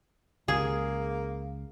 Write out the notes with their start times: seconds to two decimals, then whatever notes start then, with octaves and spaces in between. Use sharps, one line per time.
0.48 C#2 A#3 G#4